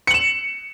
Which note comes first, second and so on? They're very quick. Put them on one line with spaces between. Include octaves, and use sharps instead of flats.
C#7 F#7 E7